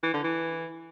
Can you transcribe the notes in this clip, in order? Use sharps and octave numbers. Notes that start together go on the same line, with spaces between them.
E3
D3
E3